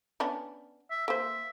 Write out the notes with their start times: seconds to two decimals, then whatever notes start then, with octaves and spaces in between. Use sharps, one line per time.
0.20 B3 C#4 D4
0.91 E5
1.08 A#3 C5 E5